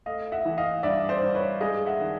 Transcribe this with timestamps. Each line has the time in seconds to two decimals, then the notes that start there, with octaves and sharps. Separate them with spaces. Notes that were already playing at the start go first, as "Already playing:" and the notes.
0.06 A3 D#5 F5
0.32 E5 F#5
0.45 E3
0.58 D#5 F5
0.83 G2 D5 E5
1.09 C5 D5
1.22 G2
1.35 B4 C#5
1.61 G#3 D#5 F5
1.86 E5 F#5
2.00 D#3 F#5